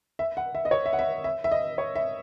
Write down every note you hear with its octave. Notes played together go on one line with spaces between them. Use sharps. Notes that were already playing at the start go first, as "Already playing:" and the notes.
E5
F#5
E5
D#5
C#5
E5
F#5
E5
E5
E5
D#5
C#5
E5